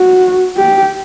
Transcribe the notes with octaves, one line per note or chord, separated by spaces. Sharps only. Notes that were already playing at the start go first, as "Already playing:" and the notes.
Already playing: F#4
G4